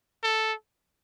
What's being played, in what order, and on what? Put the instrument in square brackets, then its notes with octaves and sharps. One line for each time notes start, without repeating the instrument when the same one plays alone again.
[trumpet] A4